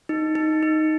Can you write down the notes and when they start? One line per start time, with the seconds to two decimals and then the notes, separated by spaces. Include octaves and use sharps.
0.09 D#4
0.35 D#4
0.63 D#4